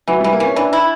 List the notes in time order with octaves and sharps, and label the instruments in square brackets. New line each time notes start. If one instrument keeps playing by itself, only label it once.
[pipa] E3 [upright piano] F#3
[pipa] E3 [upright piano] G3
[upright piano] A#3
[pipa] E3 [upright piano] C#4
[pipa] E3 [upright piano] D4
[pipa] E4